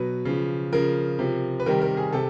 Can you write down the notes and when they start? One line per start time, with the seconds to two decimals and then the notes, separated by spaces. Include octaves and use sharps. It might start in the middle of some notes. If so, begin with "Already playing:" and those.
Already playing: B2 F#3 B4
0.25 C#3 F3
0.72 C#3 F3 A#4
1.19 C3 F3
1.60 B4
1.66 C3 D#3 G3 A#4
1.82 A#4
1.97 G#4
2.13 C3 A4